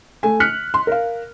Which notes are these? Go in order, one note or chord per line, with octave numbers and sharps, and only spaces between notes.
A3 G#5
F6 F#6 B6 C#7
C6
A#4 F5